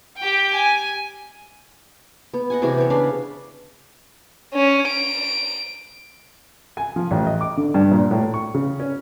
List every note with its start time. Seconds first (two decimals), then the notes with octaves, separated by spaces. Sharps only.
0.18 G4 G5
0.55 G#5
2.34 B3
2.50 D#5 F#5 G#5
2.62 C3 E3 F#4 G#4
2.78 B3 C#5
2.90 C#3 D4 F5 B5
4.54 C#4
4.88 D7
6.77 G#5
6.96 F3
7.11 A1
7.27 D#5
7.41 D6
7.57 D3
7.74 G2
7.91 A#2
8.11 A2
8.34 C#6
8.54 C#3
8.80 C#4